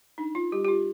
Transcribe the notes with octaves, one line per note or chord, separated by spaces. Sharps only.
D4 D#4
F4
G3 G4
G4
F4